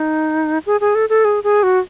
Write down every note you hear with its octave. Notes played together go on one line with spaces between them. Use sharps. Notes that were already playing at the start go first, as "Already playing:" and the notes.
Already playing: D#4
G#4
G#4
A4
A4
G#4
G#4
F#4